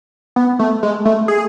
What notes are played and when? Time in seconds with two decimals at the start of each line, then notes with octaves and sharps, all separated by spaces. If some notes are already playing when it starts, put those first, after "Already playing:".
0.36 B3
0.59 A3
0.83 G#3
1.05 A3
1.28 G#4